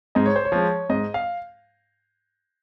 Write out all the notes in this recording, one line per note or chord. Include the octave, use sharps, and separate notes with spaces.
G#2 D#5
C#5
C5
C#5
F3 G#3
G#2 D#5
F5